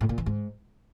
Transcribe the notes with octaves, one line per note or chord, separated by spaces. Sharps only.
A2
A#2
E3
G#2